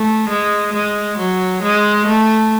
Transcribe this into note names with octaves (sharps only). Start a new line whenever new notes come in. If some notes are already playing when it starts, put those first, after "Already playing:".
Already playing: A3
G#3
G#3
F#3
G#3
A3